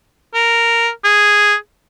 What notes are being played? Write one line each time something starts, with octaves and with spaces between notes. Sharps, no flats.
A#4
G#4